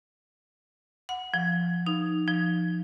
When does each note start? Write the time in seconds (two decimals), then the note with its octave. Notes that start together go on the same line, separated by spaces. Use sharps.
1.09 F#5
1.34 F3
1.87 D#4
2.27 F3